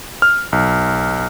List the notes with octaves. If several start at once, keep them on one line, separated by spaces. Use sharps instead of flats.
F6
B1